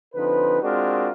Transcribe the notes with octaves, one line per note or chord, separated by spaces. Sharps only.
D3 F3 C4 D#4 B4
G#3 C4 D4 F4 F#4 A#4